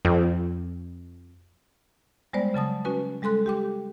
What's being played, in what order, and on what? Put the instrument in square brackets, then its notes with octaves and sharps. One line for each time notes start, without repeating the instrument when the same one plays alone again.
[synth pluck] F2
[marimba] G3 G#3 B3 C5 D5
C#3 F#3 A5 D#6
C#4 F#4 B4 G#5
G3 G#3 A4 C6 F#6
G4 G5 D6